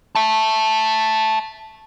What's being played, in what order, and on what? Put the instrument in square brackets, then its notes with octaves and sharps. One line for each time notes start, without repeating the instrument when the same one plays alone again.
[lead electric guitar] E5 A5